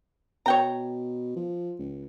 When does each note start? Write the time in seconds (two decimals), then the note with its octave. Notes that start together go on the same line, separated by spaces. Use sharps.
0.46 B2 C#5 G5 A#5
1.36 F3
1.79 C#2